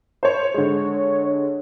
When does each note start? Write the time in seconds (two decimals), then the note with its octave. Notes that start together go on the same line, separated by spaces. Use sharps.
0.23 C5 C#5
0.54 D3 G#3 C#5